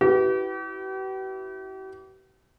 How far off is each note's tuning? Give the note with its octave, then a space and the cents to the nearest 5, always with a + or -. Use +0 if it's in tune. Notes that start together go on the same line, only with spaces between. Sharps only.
E4 +0 G4 -45 B4 +0